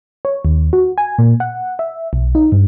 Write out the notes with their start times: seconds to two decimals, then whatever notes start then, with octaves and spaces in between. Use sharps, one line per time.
0.25 C#5
0.45 D#2
0.73 F#4
0.98 G#5
1.19 A#2
1.40 F#5
1.79 E5
2.13 B1
2.35 D#4
2.52 G2